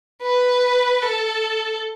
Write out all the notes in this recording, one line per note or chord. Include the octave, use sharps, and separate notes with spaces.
B4
A4